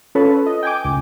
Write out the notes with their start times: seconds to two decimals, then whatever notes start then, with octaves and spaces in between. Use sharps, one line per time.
0.15 C#4 F4 A4 B4 C#5
0.46 D#5
0.63 G5 G#5 D6
0.84 C#2